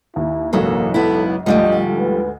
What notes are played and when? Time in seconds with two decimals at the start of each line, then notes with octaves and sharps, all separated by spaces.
0.16 D#2 E4
0.53 F#1 B1 G#2 E3 F#3 A#3 A4
0.94 B3 E4 A4
1.46 D2 G#2 F3 G3 A3 D#5
1.99 B4